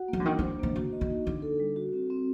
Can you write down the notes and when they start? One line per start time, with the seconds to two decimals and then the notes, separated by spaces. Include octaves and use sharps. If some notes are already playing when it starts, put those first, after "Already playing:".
Already playing: F#4 F#5
0.08 F#3 A#3
0.20 D3
0.25 D#3 D4
0.39 F#3
0.42 C5
0.59 D#3 A#3
0.75 D3 F#4
0.92 D#5
1.01 D3
1.10 D#4
1.26 D3 D4
1.42 A4
1.60 G3
1.76 F#4
1.93 C4
2.10 C4